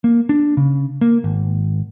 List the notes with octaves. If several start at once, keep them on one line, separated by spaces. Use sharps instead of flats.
A#3
D4
C#3
A#3
G#1